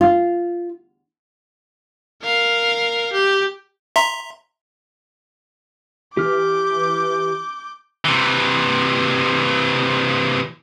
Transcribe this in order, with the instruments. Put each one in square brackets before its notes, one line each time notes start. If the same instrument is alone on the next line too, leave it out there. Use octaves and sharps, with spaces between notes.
[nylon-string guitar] F4
[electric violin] A#4 F5
G4
[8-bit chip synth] E5 A#5 C6
[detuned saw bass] E3 [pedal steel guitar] G4 F6 [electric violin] D6 G6
[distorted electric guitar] C3 E3